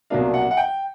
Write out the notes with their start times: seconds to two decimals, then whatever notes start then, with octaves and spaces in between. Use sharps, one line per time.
0.10 C2 B2 F#3 A#3 D4 F5
0.34 F#5
0.51 F#5
0.57 G5